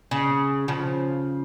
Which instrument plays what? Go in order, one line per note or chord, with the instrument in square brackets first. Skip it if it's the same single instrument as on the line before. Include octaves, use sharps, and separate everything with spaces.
[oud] C#3
C#3 F3